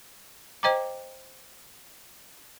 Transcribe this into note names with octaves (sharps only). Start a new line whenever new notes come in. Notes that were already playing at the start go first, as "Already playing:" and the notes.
C5 D#5 G5 A#5 D6